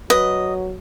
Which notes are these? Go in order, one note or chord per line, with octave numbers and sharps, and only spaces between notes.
F#3 B4 D#5